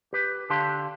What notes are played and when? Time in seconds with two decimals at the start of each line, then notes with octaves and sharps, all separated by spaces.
0.13 G4 B4
0.50 D3 D4 G4 A4 F5 C6